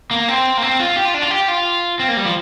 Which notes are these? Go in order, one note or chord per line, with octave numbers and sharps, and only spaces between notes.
A#3
C4
A#3
C4
F4
G4
F4
D4
F4
G4
F4
C4
A#3
G3
F3